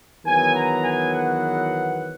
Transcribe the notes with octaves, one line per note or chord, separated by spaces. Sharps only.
E2 D#3 F#3 B3 G#5
A#5
G#5
F#5